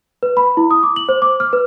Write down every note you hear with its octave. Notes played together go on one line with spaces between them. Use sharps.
B4
B5
E4
D#6
D6
F#7
C5
D6
F6
B4